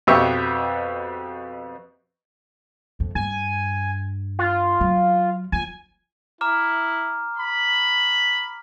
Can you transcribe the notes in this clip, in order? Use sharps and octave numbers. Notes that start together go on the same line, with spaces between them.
F2 B2 B3 G4 E5 C#6
F2
G2 G#5
F4
F#3
F3 G#5
E4 A#5 D6 F6
B5